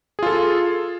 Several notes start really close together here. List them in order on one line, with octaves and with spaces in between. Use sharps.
G#4 F4 A4